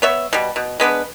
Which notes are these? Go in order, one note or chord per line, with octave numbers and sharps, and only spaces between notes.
B3 C#5 E5
B2 G3
B2
G#3 B3 D4 B4